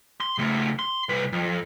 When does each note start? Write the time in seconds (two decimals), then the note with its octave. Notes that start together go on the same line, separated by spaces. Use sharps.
0.20 C6
0.38 C#3 A3
0.79 C6
1.09 C2 B4
1.32 F2